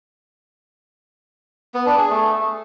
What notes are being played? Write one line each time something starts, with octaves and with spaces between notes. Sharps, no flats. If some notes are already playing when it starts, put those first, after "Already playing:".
B3
D4
G#4
A3